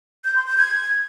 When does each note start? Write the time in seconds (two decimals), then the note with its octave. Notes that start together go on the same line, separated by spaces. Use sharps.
0.24 G6
0.35 C6
0.47 G6
0.58 G#6